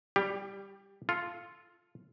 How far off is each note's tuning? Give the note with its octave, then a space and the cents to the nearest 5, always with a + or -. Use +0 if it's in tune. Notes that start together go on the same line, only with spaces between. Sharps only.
G3 +5 G4 +15
F4 +0 A4 +0